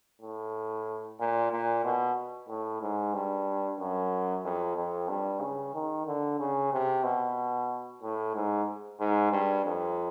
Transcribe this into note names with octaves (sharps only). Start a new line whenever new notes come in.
A2
A#2
A#2
B2
A2
G#2
G2
F#2
F2
F2
G2
C#3
D#3
D3
C#3
C3
B2
A2
G#2
G#2
G2
F2